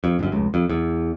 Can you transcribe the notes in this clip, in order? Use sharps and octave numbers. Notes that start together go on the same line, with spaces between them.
F2
G1 F#2
F1 C#2
F2
E2